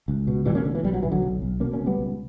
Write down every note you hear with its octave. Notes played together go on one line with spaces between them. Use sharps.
C#2
B2
B2 E3 G3
A#3 C#4
C#2 D3
E3
B1 G3
F#3
B1 E3
D3 F#3
B1
B1
B2 A#3 C#4
A#3 C#4
C#2
G3 B3
C#2